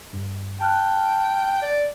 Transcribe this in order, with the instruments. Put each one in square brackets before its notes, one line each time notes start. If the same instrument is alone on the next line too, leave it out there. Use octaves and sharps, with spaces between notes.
[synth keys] G2
[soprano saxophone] G5 [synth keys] A5 F6 F#6
[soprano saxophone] D5